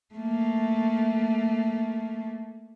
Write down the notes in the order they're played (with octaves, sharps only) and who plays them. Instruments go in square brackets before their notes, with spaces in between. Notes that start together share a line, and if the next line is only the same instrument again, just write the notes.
[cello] A3 A#3